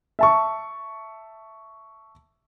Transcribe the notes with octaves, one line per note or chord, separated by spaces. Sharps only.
E5 A5 C#6